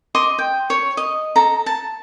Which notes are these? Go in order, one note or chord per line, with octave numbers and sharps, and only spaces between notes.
D#5 C6 D6
G5
C#5
D#5
A4 A#5
A5